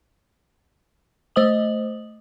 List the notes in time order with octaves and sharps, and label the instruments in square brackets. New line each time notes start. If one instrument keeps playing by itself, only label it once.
[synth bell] A3 C5 D#5 D#6 F#7